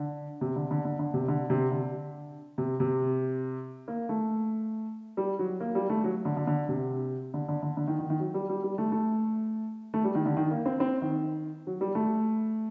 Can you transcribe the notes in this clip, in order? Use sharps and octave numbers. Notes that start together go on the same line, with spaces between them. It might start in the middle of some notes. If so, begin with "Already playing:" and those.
Already playing: D3
C3
D3
D3
D3
D3
C3
D3
C3
D3
C3
C3
A#3
A3
G3
F#3
A#3
G3
A3
F#3
D3
D3
D3
C3
D3
D3
D3
D3
D#3
D#3
D#3
F#3
G3
G3
G3
A3
A3
A3
G3
D#3
D3
D#3
A#3
C4
C4
D#3
F#3
G3
A3